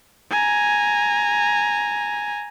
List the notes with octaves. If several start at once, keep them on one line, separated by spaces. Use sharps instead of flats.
G#5 A#5